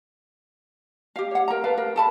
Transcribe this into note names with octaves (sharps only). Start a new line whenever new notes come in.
G4 F5
C#5 F#5
A#4 A#5
A4 B4 F5
A#4
A4 A5 B5